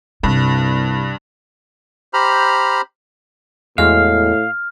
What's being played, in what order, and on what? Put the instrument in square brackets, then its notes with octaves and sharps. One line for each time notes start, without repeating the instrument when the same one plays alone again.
[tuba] C2 [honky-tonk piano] G2 [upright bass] C3
[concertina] G4 C5 A#5 B5 F6
[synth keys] E2 G#3 F#4 [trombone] A2 [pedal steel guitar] F5 [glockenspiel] F6